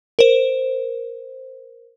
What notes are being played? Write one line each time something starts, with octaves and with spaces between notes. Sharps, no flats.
A#4 C5